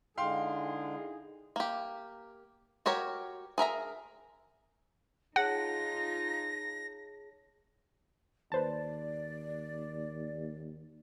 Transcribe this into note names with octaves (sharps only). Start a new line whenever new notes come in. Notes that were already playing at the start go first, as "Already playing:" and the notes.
D3 G#3 D#4 E4 G#4 F5 G5 C6
A#3 G4
F#4 G4 A#4 C#5
G#4 A#4 E5 A#5
D#4 F4 G#4 C#5 F#5 A5 A#6
D#2 B4 C5 D5 A5